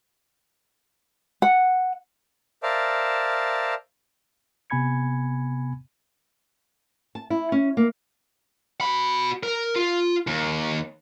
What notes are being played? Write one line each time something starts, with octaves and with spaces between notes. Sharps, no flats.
F#5
A#4 C5 D5 E5 F5 A5
C3 B3 G#5 B5 G#6 C#7
A5
E4
C#4
A#3
F#4 B5
A#4
F4
D#2